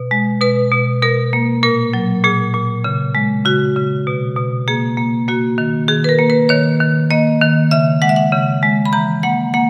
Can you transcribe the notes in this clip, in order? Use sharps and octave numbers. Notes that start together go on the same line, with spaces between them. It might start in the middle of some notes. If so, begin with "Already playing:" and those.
Already playing: B2
G#3
B2 B4
B2
B2 A#4
A#3
A#2 A#4
F#3
A#2 G#4
A#2
C#3
G#3
C#3 F#4
C#3
B2
B2
A#3 G#4
A#3
A#3 F#4
D#3
D#3 G#4
B4
A#4
A#3
B4
D#3 C#5
D#3
A#3 D#5
D#3
C#3 E5
G#3 F#5
E5
F#5
C#3
G#3
B5
E3 A#5
A#3 F#5
A#3 F#5